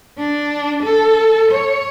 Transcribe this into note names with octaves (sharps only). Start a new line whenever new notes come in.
D4
A4
C#5